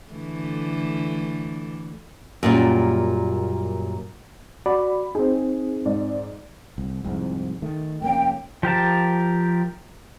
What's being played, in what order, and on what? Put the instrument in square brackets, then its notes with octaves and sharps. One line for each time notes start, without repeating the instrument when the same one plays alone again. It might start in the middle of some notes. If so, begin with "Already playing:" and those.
[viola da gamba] D3 E3 A3
[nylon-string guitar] F#2 A#2 G3
[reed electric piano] F#4 D5 [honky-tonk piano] B5
[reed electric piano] C4 D#4 [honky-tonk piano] G#4
[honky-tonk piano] G#2 D5
[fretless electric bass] C2
C2 F2 G#2
D#3 A3
[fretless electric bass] F1 A#3 C#4 [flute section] G5
[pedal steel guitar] F3 G4 A#4 A5